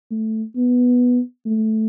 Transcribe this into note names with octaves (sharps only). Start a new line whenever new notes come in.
A3
B3
A3